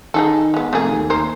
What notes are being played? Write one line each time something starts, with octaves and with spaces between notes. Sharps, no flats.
D#3 D#4 G#4 A4
G#3 B3
F1 A3 A#3 G#4
D#2
A#4 C5